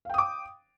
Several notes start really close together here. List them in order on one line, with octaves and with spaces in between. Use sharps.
F5 G5 D#6 D6